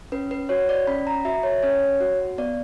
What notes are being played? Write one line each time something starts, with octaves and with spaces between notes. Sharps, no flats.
C#4 B4
B4
F#4 C#5
D5
C#4 B5
A#5
F#4 E5
C#5
C#4 C#5
F#4
B3 D5